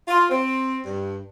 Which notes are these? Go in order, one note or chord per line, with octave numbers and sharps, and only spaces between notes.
F4
C4
G2